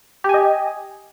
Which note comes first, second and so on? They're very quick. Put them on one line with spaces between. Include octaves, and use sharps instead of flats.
G4 G#5 D#5